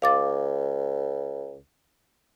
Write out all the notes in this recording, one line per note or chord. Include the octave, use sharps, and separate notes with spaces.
C#2 F5 D6 A6